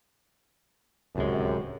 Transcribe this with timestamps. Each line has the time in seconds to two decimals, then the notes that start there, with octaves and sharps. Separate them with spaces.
1.16 D1 C#2 F#2 C3 G#3